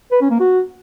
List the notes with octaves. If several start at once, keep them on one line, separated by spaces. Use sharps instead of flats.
B4
C#4
A#3
F#4